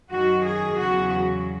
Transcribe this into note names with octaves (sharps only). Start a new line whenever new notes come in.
F#2 D#3 F#3 F#4
G#4
E2 C#3 F#3 F#4